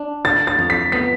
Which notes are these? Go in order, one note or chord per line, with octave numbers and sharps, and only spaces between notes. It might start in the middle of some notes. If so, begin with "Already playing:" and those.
Already playing: D4
D3 A6
A6
F2
B6
B3 B6